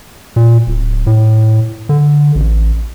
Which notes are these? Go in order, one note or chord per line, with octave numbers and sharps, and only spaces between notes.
A#2
D1
A2
D3
A1